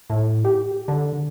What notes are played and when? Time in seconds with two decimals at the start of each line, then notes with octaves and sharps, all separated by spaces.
0.10 A2
0.45 G4
0.88 D3